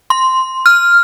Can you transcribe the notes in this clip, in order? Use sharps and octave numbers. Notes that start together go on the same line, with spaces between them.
C6
F6